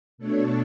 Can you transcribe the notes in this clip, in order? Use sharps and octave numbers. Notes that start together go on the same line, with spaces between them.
B2 A3 D4 A4 C#5